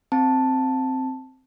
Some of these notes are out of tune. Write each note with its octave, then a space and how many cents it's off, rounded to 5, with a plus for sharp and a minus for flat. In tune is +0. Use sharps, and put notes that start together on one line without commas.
C4 +0 A5 +0